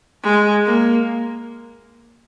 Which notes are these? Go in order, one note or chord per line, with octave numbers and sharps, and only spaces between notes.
G#3
A#3